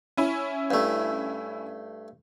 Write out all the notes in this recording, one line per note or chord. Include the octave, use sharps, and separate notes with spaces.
C#4 E4
G2 A3